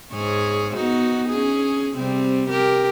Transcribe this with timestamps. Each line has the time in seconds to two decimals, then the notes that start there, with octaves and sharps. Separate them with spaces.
0.13 G#2 G#4 C#5
0.76 B3 D#4 F#4
1.29 C#4 G#4
1.97 C3 G3 C4
2.49 G4 A#4